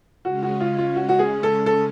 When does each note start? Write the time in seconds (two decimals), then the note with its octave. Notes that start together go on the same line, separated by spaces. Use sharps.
0.25 C#3 G#3 C#4 F#4
0.43 F#4
0.60 F4
0.78 F4
0.96 F#4
1.09 F#4
1.19 G#4
1.43 A4
1.66 A4